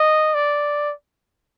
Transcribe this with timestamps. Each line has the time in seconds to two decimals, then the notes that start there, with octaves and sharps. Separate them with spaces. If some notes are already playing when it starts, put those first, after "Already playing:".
Already playing: D#5
0.34 D5